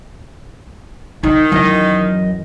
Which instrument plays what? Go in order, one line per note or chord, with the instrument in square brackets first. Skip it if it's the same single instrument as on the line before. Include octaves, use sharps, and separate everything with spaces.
[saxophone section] D#3 [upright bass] D#4
[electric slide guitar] F#2 D#5 [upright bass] E3